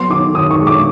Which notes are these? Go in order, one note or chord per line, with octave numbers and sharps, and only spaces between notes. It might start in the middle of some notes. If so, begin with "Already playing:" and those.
Already playing: F#3 B3 C6
D#3 D6
D#3 D#6
C#6
G#3
D6